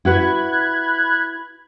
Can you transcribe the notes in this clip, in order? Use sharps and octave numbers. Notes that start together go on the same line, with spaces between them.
E4 F#4 B4 B5 F#6 G#6